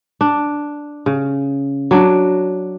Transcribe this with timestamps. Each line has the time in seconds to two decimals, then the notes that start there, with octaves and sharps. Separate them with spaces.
0.21 D4
1.06 C#3
1.91 F#3 D4